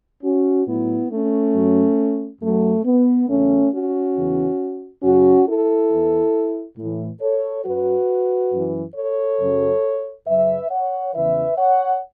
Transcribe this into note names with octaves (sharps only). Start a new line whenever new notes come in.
C#4 F#4
A2 F#3 B3 E4
A3 C#4
F#2 F#3
F#2 F#3 A3
B3
E2 C#3 F#3 A3 C#4
C#4 F#4
E2 C#3 E3
F#2 C#3 F#3 C#4 F#4
E4 A4
E2 E3
A2 E3
A4 C#5
F#2 F#3 F#4 B4
F#2 E3
A4 C#5
F#2 C#3 F#3
F#2 C#3 F#3 B4 E5
C#5 F#5
E2 C#3 E3 B4 E5
C#5 F#5